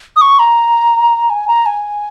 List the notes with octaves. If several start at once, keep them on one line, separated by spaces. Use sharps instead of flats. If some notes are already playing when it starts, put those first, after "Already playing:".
D#6
C#6
A#5
G#5
A#5
G#5